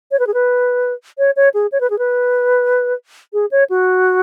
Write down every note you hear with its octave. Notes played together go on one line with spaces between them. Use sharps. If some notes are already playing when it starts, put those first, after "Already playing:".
C#5
B4
G#4
B4
C#5
C#5
G#4
C#5
B4
G#4
B4
G#4
C#5
F#4